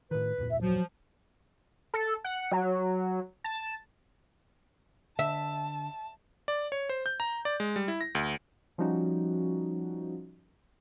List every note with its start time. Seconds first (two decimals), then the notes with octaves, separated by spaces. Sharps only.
0.11 A2 D#3 B4
0.38 D1 F2 A#2
0.50 E5
0.62 F3 F#3
1.94 A4
2.25 F#5
2.52 F#3
3.44 A5
5.19 D3 E5 A5
6.48 D5
6.72 C#5
6.89 C5
7.06 G6
7.20 A#5
7.45 D5
7.60 G#3
7.76 G3
7.88 E4
8.01 A#6
8.15 D2
8.78 F3 G3 C#4 D#4 F#4